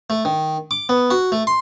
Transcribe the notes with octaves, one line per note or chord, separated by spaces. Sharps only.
A3
D#3
D6
B3
F#4
A3
C6